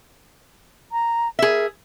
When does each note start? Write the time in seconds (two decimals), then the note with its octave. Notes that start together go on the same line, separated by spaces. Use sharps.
0.92 A#5
1.39 G#4 A#4 E5